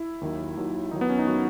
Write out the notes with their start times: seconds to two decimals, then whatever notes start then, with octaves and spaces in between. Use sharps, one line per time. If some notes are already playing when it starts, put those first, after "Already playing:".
Already playing: E4
0.21 D#2 D#3 F#3
0.57 D#2 D#3 F#3
0.91 D#2 D#3 F#3 D#4
1.01 B3
1.10 C#4
1.19 D#4
1.27 D#3 F#3 F#4